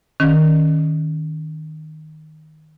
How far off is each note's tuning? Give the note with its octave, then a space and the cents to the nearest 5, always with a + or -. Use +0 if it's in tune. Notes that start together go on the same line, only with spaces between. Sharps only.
D#3 +0 C#4 +0